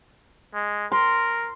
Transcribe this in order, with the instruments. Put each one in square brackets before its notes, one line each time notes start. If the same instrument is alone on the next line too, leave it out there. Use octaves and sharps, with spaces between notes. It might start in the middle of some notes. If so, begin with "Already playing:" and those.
[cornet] G#3
[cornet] A#4 [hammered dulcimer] C6